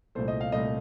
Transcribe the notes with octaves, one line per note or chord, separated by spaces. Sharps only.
C2 A#2 A3 C5
D#5
F5
C2 A#2 A3 D#5